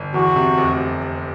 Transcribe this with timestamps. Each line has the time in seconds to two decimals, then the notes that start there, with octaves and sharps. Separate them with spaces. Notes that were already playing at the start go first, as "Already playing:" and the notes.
Already playing: G1
0.14 E2 F#4
0.36 C3
0.58 F1